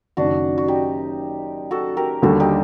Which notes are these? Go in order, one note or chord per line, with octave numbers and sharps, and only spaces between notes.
F#1 F#2 D#3 D4 F#4
F#4
D#4 G4
F#4 A4
G4 A#4
D#2 D3 G3 F#4 A4
D#4 G4